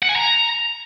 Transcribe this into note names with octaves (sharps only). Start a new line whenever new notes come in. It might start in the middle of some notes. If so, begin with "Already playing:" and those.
F#5
G#5
A#5